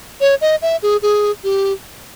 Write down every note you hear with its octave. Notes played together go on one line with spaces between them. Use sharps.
C#5
D#5
E5
G#4
G#4
G4